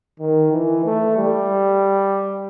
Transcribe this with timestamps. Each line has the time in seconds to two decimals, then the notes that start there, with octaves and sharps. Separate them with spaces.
0.20 D#3
0.53 E3
0.86 A3
1.17 G3